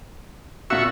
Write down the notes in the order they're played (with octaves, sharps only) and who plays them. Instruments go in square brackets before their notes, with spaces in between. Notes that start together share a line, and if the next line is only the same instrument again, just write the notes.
[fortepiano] A#2 F4 E6 [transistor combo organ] F#4 E5 C#6